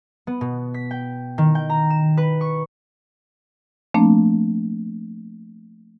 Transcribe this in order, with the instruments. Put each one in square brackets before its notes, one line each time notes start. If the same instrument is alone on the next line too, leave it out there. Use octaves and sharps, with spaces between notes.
[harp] B3
B2
B6
G5
D#3
G5
A#5
E7
B4
C#6
[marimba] F3 A3 A#3 C4 D4